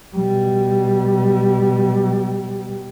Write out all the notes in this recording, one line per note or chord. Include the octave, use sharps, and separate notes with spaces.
B2 G3